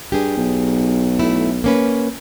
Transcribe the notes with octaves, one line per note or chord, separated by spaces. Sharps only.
G2 G4 G#4
B1
A3 E4
A#3 C#4 B4